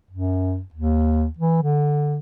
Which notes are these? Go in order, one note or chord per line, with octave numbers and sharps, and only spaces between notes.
F#2
D#2
E3
D3